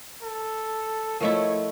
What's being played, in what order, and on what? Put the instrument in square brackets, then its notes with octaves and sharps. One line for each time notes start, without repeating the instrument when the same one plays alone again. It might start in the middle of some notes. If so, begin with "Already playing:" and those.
[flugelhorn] A4
[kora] F3 A3 E4 [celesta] A#4 D#5 [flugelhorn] C#5